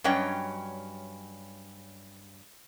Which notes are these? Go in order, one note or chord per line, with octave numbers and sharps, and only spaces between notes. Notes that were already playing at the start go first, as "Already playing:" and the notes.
G2 F#3 C#4 C#5 D#5 G5